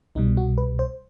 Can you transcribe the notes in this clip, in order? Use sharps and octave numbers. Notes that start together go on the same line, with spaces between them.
C2 B2 G3 D#4
F#4
B4
C5